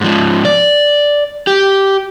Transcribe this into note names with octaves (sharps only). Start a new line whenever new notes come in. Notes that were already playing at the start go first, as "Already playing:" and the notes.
G#2 F3
D5
G4